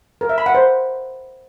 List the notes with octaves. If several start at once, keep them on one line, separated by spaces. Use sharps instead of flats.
A#4
E5
B5
F#5
C5